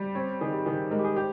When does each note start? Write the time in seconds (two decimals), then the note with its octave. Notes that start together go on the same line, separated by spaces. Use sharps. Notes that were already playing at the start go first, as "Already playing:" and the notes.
Already playing: G3
0.15 C4 C#5
0.41 D#3 G#4
0.53 G4
0.65 D#3 G#4
0.91 G#3 A#4
0.99 G4
1.04 G#4
1.16 G4 C5